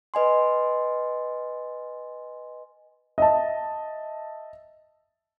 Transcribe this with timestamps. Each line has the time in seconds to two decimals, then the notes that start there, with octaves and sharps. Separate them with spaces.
0.14 B4 D#5 G#5 C6
3.18 D#5 E5 A5